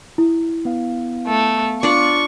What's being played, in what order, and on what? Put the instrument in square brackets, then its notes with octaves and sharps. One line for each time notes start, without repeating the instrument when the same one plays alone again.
[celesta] E4
[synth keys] B3 F5
[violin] A3
[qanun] D4 F4 D5 [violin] C#6